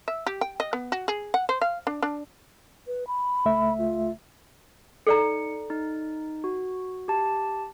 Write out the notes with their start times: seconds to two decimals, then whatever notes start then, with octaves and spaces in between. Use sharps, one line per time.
0.08 E5
0.27 G4
0.41 G5
0.60 D#5
0.73 B3
0.92 F#4
1.08 G#4
1.34 F#5
1.49 C5
1.61 F5
1.87 D4
2.02 D4
2.87 B4
3.07 B5
3.45 C#2 A3 E5
3.78 F4
5.07 D#4 A4 D5 A#5 C#7
5.70 D#4
6.44 F#4
7.08 G4 A5